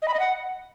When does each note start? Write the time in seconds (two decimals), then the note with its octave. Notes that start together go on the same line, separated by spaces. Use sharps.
0.02 D#5
0.08 B5
0.14 D#5
0.19 F#5